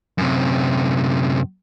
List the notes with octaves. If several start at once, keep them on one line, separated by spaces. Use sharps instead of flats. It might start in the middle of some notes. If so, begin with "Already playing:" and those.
F#2 C3